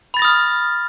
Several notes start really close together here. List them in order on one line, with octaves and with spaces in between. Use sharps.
B5 A6 A#6 D#6 F6